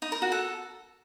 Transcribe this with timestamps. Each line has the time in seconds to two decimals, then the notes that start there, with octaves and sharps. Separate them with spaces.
0.02 D#4
0.12 A#4
0.22 F#4
0.32 A4